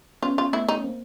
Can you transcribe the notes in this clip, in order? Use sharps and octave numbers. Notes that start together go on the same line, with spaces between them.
B3 C#4 F4
F4
A3 B3 E4
D#4
C#4
A#3 C4